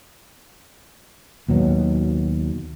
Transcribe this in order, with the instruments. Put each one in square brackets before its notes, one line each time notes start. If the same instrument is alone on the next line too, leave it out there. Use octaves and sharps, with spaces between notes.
[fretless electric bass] D#2 B2 F#3